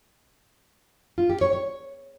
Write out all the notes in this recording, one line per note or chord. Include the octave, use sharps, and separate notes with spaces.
F4
G4
C#5
C#5